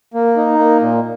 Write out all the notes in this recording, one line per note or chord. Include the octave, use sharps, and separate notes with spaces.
A#3
D#4
A#3
A#2